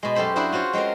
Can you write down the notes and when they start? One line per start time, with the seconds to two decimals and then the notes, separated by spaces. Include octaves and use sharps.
0.03 B2 G#3
0.15 F#2 G4 A4 C5 B5
0.36 D4 E4 F#4 G#4 C5
0.52 F4 F#4 C5 C#5
0.73 G#3 C4 C#4 F4 A#4